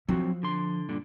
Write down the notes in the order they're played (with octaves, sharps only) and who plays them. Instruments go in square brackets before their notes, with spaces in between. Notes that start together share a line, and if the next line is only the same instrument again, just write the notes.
[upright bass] F3 [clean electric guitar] F#3 C4 F#4
[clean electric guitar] D3 C6
G2 A#2 D3